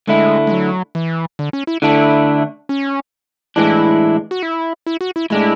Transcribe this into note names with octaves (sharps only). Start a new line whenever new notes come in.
D3 G#3 A3 E4
G#3
F#3
E3
D3
C#4
E4
D3 A3 D4 E4
C#4
A2 E3 G#3 D4 E4
F#4
E4
E4
F#4
E4
A2 G#3 D4 E4